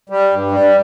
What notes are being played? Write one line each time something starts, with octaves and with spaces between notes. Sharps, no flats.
G3
G2
G3